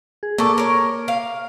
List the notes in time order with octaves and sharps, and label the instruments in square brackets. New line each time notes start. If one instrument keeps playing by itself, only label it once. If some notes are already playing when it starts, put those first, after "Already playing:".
[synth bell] G#4
[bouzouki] A#2 A4 [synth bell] A#3 C#6 D6
[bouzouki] A#4 C#5
F5